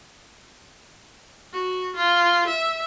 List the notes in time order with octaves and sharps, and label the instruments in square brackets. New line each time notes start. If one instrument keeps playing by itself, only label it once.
[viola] F#4
F4
E5